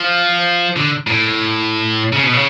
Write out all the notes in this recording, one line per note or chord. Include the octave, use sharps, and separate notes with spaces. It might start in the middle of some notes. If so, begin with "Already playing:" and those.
Already playing: F3
D3
A2
C#3
B2
C#3